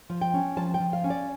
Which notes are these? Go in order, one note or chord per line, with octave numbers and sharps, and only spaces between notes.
F3
G5
C#4
F3 A5
G5
F3
F5
C#4
D5